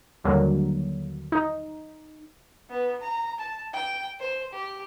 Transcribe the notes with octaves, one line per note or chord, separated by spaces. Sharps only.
D#2 D3 F#3 G3 A#3
D#4
B3
A#5
A5
G5
C5
G4